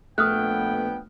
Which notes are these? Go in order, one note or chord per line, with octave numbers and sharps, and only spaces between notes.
A#1 A3 B3 G5 D#6 F6 F#6